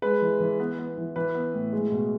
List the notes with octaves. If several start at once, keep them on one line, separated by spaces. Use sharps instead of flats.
G#3 B4
E3
E3
B3
B3
E3
E3 B4
B3
A2
G#3
B2